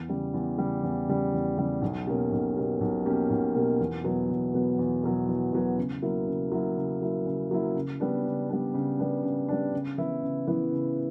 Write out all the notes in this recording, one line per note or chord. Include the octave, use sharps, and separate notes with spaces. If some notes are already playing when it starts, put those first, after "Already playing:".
Already playing: E2
C#3 G3
E2
C#3 G3
E2
C#3 G3
E2
C#3 G3
B1
B2 A#3 C#4 G4
B1
B2 A#3 C#4 G4
B1
B2 A#3 C#4 G4
B1
B2 A#3 C#4 G4
E2
B2 F#3 B3
E2
B2 F#3 B3
E2
B2 F#3 B3
E2
B2 F#3 B3
C#3
F#3 A#3 E4
C#3
F#3 A#3 E4
C#3
F#3 A#3 E4
C#3
F#3 A#3 E4
C#3
G3 B3 D4
C#3
G3 B3 D4
C#3
G3 B3 D4
C#3
G3 B3 D4
C#3
E3 B3 E4
C#3
E3 B3 E4
C#3